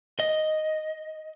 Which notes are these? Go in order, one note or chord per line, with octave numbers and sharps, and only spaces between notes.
D#5